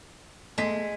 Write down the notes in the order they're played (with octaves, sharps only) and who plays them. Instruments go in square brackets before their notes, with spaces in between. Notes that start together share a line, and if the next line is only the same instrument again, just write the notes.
[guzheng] G#3 [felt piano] A3 B6